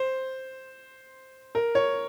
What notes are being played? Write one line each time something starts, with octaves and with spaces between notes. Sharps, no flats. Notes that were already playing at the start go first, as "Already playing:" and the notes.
Already playing: C5
A#4
C#5